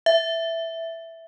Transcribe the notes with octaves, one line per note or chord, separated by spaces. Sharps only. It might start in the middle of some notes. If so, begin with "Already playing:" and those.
E5